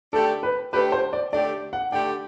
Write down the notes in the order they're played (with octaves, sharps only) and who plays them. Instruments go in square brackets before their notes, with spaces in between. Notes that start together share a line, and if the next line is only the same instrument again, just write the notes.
[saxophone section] D3 A3 D4 G4 [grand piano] A4
[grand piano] B4
[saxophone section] D3 A3 D4 G4 [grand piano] B4
[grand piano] C5
D5
[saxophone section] D3 A3 D4 G4 [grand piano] D5
[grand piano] F#5
[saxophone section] D3 A3 D4 G4 [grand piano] G5